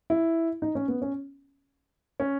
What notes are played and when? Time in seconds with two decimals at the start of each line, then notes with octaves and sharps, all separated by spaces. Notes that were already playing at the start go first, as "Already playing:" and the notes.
0.10 E4
0.62 D#4
0.75 C#4
0.88 B3
1.02 C#4
2.20 C#4